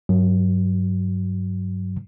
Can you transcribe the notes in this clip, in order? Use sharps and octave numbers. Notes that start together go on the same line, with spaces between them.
G2 F#3